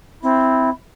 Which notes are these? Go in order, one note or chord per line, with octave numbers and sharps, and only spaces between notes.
C4 E4